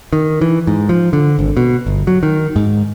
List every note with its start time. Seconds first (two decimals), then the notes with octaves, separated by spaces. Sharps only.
0.13 D#3
0.41 E3
0.67 G#2
0.89 F3
1.13 D3
1.39 G#1
1.57 B2
1.87 G1
2.07 F#3
2.23 D#3
2.56 G#2